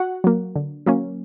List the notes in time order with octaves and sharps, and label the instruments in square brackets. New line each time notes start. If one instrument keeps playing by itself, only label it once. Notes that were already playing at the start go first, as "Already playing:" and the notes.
Already playing: [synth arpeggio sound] F#4 F#5
F#3 A#3
D3
F#3 A#3 C#4